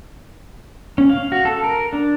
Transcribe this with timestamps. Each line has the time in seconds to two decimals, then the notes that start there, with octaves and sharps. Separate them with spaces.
0.98 C#4
1.09 F5
1.32 F#4
1.45 A4
1.64 A#4
1.93 D4